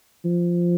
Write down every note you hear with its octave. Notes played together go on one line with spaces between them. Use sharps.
F3